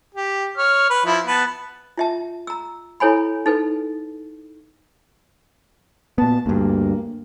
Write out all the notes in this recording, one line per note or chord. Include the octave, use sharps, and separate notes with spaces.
G4
C#5 F6
B4
F3 E4
B3 B4 A5
F4 E5 A5
A#5 E6
E4 A4 C#5 G#5 B5
D#4 A4 B4
A#2 B3 A5
D2 G2 A#3